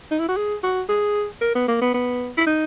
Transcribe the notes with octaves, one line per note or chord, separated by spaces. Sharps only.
D#4
E4
F#4
G#4
F#4
G#4
A#4
B3
A#3
B3
B3
E4
D#4